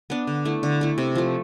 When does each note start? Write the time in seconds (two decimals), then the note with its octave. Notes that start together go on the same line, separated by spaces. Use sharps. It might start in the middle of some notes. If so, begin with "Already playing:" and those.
0.10 B3 D4
0.27 D3
0.45 A3 E4
0.63 D3
0.81 A3 E4
0.98 C3
1.15 F3 A3